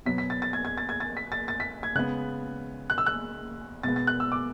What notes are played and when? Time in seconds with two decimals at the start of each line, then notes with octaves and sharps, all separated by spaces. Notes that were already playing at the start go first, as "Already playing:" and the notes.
0.06 B2 F#3 B3 B6
0.18 B6
0.30 A6
0.42 A6
0.53 G#6
0.65 G#6
0.78 A6
0.89 G#6
1.00 A6
1.17 B6
1.32 A6
1.48 A6
1.60 B6
1.83 G#6
1.95 C#3 G#3 B3 F#6
2.90 F#6
2.98 E6
3.06 F#6
3.83 B2 G#3 B3 A6
3.96 A6
4.07 F#6
4.20 E6
4.32 D6